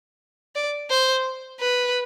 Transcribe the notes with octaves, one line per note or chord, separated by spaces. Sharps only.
D5
C5
B4